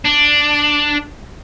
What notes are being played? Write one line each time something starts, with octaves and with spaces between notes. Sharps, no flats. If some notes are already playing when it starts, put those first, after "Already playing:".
D4